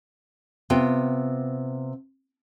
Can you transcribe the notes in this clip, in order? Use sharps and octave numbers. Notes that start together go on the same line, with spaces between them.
C3 B3 F4 G5